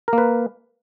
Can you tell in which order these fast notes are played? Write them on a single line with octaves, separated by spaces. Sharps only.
A#4 A#3 B4